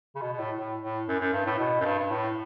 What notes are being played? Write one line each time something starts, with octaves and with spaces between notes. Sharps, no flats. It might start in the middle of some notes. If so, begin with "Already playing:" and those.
C#3
B2
B2
A2
A2
A2
F#2
F#2
G2
A2
B2
F#2
G2
G2
A2